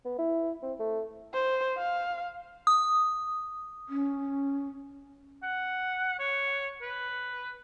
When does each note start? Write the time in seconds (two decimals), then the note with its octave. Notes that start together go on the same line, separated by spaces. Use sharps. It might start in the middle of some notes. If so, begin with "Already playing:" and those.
0.05 B3
0.18 E4
0.63 C4
0.80 A3
1.34 C5
1.78 F5
2.67 D#6
3.89 C#4
5.43 F#5
6.19 C#5
6.82 B4